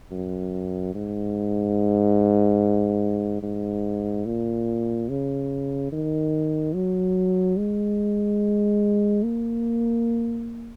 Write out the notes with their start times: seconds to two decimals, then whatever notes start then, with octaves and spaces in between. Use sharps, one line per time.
0.11 F#2
0.94 G#2
3.43 G#2
4.26 A#2
5.09 C#3
5.92 D#3
6.75 F#3
7.58 G#3
9.23 A#3